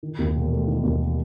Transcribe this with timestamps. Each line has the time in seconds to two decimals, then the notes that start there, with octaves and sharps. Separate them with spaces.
0.03 D#3
0.19 D#2
0.36 E1
0.52 A3
0.67 D#3
0.83 D#2